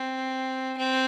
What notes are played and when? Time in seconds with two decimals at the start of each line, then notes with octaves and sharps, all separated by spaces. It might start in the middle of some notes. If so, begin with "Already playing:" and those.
Already playing: C4
0.77 C4